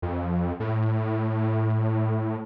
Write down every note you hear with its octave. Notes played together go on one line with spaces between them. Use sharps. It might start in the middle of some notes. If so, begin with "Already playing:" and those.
F2
A2